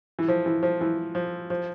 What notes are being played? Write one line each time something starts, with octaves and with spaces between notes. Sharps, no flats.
E3
F3
E3
F3
E3
F3
F3